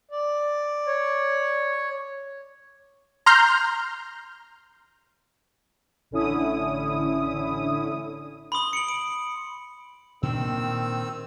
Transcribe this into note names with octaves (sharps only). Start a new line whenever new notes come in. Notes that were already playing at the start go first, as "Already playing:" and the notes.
D5
C#5
A#5 C6 F6 G6
A1 D3 C#4 E4 D#6
B5 C6 D#6 G7
C#7 D7 F#7
D7
A#2 D#3 C4 D4 E6